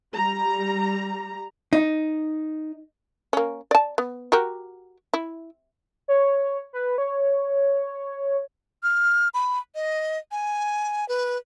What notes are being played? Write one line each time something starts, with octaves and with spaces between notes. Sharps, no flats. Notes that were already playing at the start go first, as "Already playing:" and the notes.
G3 A#5
D#4
A#3 C#4
D5 A5
B3
F#4 G4 A#4
E4
C#5
B4
C#5
F6
B5
D#5
G#5
B4